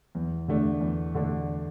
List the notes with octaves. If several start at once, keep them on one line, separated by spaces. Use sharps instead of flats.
E2
D3 A3 D4
E2
D3 A3 D4